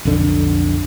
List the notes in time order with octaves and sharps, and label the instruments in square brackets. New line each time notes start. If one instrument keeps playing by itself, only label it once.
[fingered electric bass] B1 F2 D3